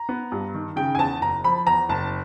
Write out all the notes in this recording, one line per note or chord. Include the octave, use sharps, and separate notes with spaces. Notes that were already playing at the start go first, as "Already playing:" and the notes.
Already playing: A#5
B3
G2
D#3
C#3 G5
G#5
E2 A5
F#1 A#5
F3 B5
E2 A#5
F#1 A5